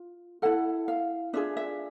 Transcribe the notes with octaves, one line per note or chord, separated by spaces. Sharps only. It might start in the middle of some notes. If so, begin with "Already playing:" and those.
Already playing: F4
E4 A4 F#5
F5
D4 F4 G#4 E5
E5